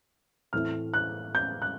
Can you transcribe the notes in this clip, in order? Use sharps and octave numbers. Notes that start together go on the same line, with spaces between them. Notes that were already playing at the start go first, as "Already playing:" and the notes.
A2 E3 A3 C4 F6
F#6
G6
F#6